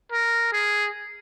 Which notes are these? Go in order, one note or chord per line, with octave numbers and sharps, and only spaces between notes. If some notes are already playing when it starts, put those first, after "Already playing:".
A#4
G#4